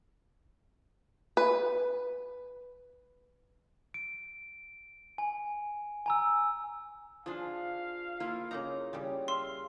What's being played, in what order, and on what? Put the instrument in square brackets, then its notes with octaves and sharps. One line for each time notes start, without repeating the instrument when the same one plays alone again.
[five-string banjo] B4
[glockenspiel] D7
G#5
G#5 A#5 E6
[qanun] F3 D4 [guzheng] G#4 C6 [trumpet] F5
[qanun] A#3 E4 F4
[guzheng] C#3 A#3 D#4 [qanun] A#5
[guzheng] C#3 G3
[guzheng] E5 [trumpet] F5 [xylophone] C6